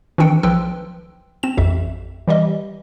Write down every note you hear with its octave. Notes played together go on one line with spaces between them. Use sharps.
D#3 E3 C4 D4 G5 C#7
B1 F3 B4 G5 C6 E6
C4 E7
A1 F2 E5
E3 G3 G4 D#5